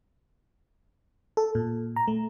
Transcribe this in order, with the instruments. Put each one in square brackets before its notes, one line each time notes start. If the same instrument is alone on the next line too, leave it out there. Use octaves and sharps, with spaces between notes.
[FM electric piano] A4
A#2
A#5
A3